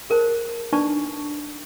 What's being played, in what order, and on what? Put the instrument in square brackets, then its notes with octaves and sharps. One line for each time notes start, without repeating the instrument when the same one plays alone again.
[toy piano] G#4 A#4 C5 A5
D4 D#4 B4 D5 A5 C#6